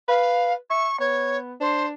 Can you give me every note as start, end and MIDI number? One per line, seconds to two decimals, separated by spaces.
0.08 0.55 71
0.08 0.53 77
0.70 0.88 76
0.70 1.00 85
1.00 1.53 59
1.00 1.38 73
1.61 1.92 62
1.61 1.86 72